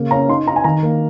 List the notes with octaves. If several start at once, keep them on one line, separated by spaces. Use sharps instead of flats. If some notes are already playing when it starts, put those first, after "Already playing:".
Already playing: C#3 A#3
C#4 A#5
D#4 C6
D#4 A#5
G#5
D#3 A#5
A#3